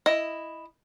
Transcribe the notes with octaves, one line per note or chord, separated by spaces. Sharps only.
E4 D#5